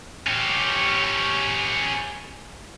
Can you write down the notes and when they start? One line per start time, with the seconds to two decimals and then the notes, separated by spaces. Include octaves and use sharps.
0.27 C#4 G4